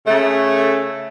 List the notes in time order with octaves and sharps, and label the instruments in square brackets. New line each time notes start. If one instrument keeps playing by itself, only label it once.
[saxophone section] C#3 A3